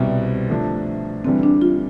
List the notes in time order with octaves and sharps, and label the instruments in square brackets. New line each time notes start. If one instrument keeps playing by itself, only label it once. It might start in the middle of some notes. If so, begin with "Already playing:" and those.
Already playing: [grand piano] C2 B2 G3 C4
D3 F3 A3 D4
[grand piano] E2 D3 G3 [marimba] C4
[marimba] D4
F4